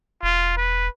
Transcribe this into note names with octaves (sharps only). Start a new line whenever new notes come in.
E1 F4
B4